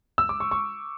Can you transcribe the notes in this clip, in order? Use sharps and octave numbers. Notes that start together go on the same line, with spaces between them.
E6
D6
C#6
C#6